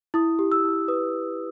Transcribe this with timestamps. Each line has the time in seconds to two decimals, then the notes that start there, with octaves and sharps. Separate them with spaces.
0.14 E4 D#6
0.39 G4
0.52 E6
0.64 E4
0.88 B4 D#6